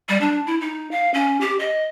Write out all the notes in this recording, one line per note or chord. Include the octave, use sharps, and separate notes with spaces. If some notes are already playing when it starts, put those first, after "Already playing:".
G3
D4
E4
D#4
F5
C#4
G4
D#5